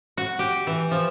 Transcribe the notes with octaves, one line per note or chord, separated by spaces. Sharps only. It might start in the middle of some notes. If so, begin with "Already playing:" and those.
F#4
G4
E3
F3